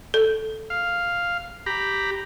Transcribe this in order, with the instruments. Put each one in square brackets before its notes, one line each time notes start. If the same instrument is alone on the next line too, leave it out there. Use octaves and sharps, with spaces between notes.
[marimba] A4
[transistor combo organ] F5
G4 A#5 B5